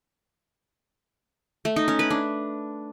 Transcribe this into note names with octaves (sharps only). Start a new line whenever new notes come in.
A3
D#4
C#4
B4
D4